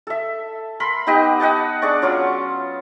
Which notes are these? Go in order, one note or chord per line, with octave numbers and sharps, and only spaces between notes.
A4 E5
A#4 B5 C6
B3 D#4 G4 D#5
D#5 F#5 G5 A5
D4 G#4 D5 C#6
F#3 C#4 F4 C#5